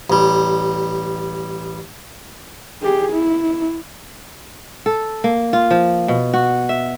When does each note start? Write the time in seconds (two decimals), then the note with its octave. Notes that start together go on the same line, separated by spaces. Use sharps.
0.10 A1 G3
2.82 G4 G#4
3.12 E4
4.86 A4
5.24 A#3
5.53 F4
5.71 F3
6.08 B2
6.34 F#4
6.69 E5